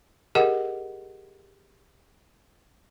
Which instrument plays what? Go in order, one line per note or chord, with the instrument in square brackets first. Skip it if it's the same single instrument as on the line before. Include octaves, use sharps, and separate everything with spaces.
[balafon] G4 G#4 A#4 D#5 F#5